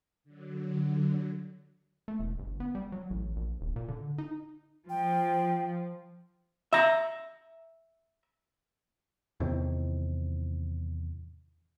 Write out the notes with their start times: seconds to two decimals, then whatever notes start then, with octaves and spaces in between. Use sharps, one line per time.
0.24 D3 F#3
2.08 A3
2.20 E1
2.39 G1
2.60 B3
2.75 G3
2.92 F#3
3.11 A1
3.36 A#1
3.61 D#1
3.76 A#2
3.88 D3
4.18 D#4
4.89 F3 G5
6.73 E5 A#5
9.40 E2 A2 C3 D#3